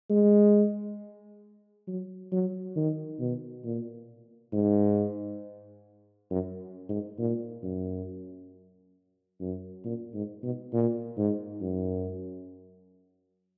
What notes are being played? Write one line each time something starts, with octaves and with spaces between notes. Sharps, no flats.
G#3
F#3
F#3
D#3
B2
A#2
G#2
F#2
G#2
A#2
F#2
F#2
A#2
G#2
B2
A#2
G#2
F#2